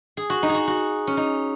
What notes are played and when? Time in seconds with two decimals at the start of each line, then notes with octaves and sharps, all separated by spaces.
0.17 G#4
0.30 F#4
0.43 D#4
0.49 G#4
0.55 F#4
0.68 F#4
1.07 C#4
1.17 D#4